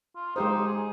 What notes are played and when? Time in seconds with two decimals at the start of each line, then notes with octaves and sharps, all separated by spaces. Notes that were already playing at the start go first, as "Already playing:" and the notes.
0.16 F4
0.36 G#3 D#4 G4 C5
0.67 G#4